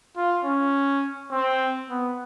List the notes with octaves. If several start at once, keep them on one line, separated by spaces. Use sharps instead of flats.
F4
C#4
C4
B3